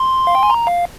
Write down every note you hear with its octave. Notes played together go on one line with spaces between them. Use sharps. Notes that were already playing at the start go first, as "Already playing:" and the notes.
Already playing: C6
F5
G5
G#5
A#5
F5